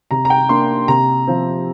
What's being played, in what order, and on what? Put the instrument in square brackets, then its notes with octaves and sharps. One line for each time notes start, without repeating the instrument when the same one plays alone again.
[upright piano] C3 A#5
A#5
G5
A#3 D4 C6
C3 A#5
F3 C4